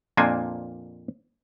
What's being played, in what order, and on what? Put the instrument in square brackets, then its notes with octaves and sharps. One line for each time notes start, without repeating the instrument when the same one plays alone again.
[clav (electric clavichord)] F2 A#2 A#3 D4 C5 G#5